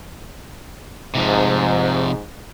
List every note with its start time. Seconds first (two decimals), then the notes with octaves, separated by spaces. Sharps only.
1.15 G#2 C3 F3